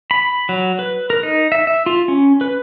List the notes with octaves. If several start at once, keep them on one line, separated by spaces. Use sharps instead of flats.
B5
F#3
B4
A#4
D#4
E5
E5
F4
C#4
B4